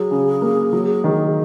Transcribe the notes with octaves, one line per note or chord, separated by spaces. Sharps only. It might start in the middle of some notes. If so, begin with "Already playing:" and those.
Already playing: F#3 G#4
C#3
A#3
F#3
D#3